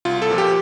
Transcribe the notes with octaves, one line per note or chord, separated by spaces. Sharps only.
C2 F4
A4
A#2 F3
G4